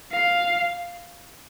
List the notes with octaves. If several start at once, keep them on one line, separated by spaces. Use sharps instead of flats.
F5